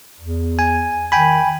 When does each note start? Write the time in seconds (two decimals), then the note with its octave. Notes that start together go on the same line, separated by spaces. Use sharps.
0.20 E2
0.59 G#5
1.12 D#3 G5 G#5 B5